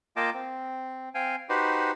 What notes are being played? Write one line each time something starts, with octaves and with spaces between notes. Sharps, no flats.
A#3 F4 D#5 G5 A5 D6
C4
C4 F5 G5 G#5
D#4 F#4 G4 B4 C5